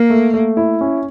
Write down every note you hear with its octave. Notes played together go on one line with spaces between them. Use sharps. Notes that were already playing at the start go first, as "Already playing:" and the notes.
Already playing: A#3 A#4
A3
A3
E4
C#4